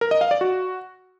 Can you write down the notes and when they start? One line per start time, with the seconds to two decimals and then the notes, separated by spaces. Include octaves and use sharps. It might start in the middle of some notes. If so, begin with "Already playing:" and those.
0.01 A#4
0.11 D#5
0.21 F5
0.31 D5
0.41 F#4